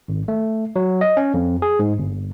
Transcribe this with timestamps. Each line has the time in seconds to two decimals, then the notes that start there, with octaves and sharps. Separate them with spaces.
0.08 G#1
0.28 A3
0.76 F#3
1.01 D#5
1.17 C#4
1.34 F2
1.62 G#4
1.79 G#2
1.99 G1